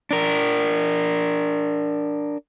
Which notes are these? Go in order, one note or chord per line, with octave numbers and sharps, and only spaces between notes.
D4 A#4